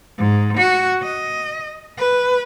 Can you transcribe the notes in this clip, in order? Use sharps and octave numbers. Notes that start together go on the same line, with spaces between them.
G#2
F#4
D#5
B4